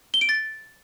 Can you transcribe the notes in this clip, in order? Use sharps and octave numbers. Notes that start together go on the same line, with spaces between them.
G7
D7
A6